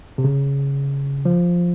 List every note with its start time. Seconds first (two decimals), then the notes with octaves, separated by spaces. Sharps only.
0.18 C3
0.24 C#3
1.25 F3